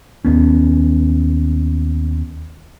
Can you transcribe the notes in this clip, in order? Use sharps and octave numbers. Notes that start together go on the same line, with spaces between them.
D#2 B3 C#4